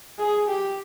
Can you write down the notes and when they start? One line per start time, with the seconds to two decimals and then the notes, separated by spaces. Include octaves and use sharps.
0.19 G#4
0.48 G4